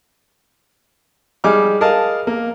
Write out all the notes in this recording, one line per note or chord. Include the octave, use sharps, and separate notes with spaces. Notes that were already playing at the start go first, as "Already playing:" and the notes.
G3 G#3 D#4 G#5 D6 F6
G#4 A#4 D#5 F5 A5
A#3